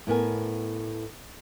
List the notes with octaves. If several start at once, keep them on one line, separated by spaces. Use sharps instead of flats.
A2 B3 A#4 G#5